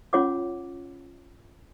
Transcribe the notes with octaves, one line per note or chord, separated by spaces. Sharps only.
C#4 F4 C#5 F#5 D6